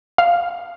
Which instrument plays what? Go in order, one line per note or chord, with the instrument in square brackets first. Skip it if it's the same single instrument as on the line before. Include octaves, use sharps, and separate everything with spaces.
[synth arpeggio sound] F5